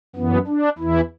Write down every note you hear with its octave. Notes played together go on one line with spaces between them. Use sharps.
F#2 E3 B3
D4
E2 E3 E4